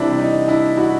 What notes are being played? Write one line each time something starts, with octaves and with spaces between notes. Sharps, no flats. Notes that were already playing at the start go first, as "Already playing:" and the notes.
Already playing: C3 E3 G3 C4 D4 E4
D#4
D4 E4
E4 F#4